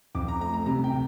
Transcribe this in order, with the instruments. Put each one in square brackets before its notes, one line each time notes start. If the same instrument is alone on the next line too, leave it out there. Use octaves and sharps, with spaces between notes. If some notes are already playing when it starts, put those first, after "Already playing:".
[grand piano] F2 D6
A#5
A3 A#5
A#5
C3 A#5
G5
C3